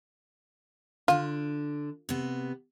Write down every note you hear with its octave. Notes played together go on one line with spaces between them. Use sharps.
D3 D4 F4
C3 B3